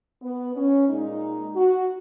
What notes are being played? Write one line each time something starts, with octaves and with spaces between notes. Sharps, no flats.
B3
C#4
A#2 G#3 D#4
F#4